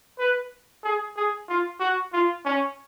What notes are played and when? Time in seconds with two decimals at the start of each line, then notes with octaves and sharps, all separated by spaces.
0.18 B4
0.84 G#4
1.16 G#4
1.48 F4
1.79 F#4
2.13 F4
2.45 C#4